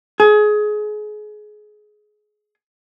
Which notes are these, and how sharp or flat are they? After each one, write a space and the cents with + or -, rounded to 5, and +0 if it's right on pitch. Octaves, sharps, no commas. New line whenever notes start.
G#4 +25